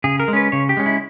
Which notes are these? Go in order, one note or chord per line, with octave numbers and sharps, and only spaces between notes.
C#3 G#4
A#4
G#3
C#4 B4
C#3 C#5
G4
G#3 C#4
E4